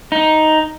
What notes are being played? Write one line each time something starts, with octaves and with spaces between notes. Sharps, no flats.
D#4